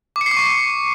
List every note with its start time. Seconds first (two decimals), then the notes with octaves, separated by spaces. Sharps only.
0.16 D6
0.21 C#7
0.26 C7
0.31 D6
0.37 C#6